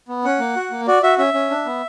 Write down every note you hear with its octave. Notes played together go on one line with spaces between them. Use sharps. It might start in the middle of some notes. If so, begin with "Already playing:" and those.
B3
C#4 F#5
A#3
F#4
A#3
F#4 D5
F#4 E5
C#4 E5
C#4
D4
B3